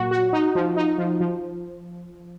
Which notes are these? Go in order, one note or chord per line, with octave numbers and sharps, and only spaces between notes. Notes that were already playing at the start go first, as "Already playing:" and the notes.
Already playing: A#2 F#3 F#4
F#4
D#4
F3
D#4
F3
F3